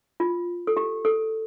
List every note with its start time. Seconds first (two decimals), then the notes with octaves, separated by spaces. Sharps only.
0.20 F4
0.67 A4
0.77 G4
1.05 A4